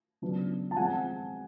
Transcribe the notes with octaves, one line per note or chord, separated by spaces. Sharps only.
C#3 F#3 B3 D4
A5
F3 G#3 C4 F#5 G#5